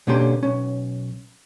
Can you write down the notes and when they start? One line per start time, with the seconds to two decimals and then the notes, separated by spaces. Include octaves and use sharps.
0.07 B2 D3 A#3 C#4 G4 C6
0.43 B1 C#4